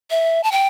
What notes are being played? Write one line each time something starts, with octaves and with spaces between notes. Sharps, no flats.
E5
A5
G5